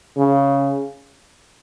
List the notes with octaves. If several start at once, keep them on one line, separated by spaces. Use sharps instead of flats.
C#3